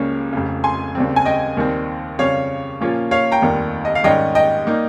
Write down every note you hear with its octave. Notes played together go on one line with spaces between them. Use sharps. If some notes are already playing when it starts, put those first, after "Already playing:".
Already playing: C#2 C#3 G3 A#3 C#4
F1 F2 C#3
G#5 C6
D#2 C#3 G3 C4
G#5
D#5 G5
D#2 D#3 G3 C4
F2 C#3 G3 C#4 C#5 F5
A#2 F3 A#3 C#4 F4
C#5 F5
G5 A#5
F1 D#2 D#3 G3
D#5
F5
G#2 D#3 G3 C#4 D#5 G5
D#5 G5
G3 A#3 D#4